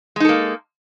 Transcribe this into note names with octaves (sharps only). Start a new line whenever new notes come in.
G#3 A#3 D#4 A4